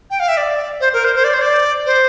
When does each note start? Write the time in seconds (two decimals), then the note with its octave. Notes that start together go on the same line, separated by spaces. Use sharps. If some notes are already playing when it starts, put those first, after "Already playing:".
0.10 G5
0.20 F5
0.28 E5
0.37 D5
0.81 C5
0.93 A#4
1.04 C5
1.16 C5
1.24 D5
1.34 C5
1.42 D5
1.86 C5